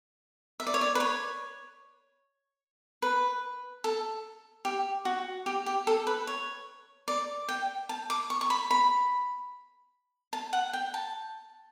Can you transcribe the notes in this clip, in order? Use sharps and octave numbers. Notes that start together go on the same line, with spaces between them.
E5
D5
C#5
D5
B4
C#5
B4
A4
G4
F#4
G4
G4
A4
B4
C#5
D5
G5
A5
D6
C#6
C#6
B5
B5
A5
F#5
G5
A5